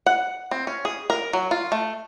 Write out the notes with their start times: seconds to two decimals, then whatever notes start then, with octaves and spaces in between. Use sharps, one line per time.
0.06 F#5
0.51 C4
0.67 C#4
0.85 G#4
1.10 A#4
1.33 F#3
1.51 F4
1.72 A3